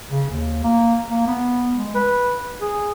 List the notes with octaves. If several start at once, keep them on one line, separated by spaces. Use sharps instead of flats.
C#3
D#2
A#3
A#3
B3
G#3
B4
G#4